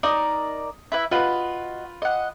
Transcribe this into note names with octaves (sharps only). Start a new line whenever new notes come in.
D#4 A#4 D5 D#6
E4 B4 E5
F4 F#4 B4 D#5
D#5 F#5